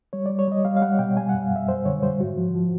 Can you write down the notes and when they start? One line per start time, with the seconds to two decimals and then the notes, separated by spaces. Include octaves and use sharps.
0.13 G3 C#5
0.26 G3 D5
0.39 C#5
0.48 G3 D#5
0.65 G3 F5
0.77 F5
0.82 G3 F#5
0.99 B2 G5
1.16 G3 G#5
1.29 F#2 F#5
1.43 F5
1.51 F#2 E5
1.68 F#2 C5
1.85 D3 C#5
2.03 G3 C5
2.20 G#2 F#4
2.37 F3
2.55 F3